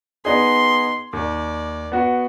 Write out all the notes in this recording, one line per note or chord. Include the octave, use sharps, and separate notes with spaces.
B3 D#4 G#4 C6
D#2 D5
B3 F#4